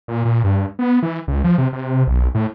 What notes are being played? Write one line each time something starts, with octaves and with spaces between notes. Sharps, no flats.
A#2
A#2
G2
B3
E3
C#2
F3
C3
C3
B1
A2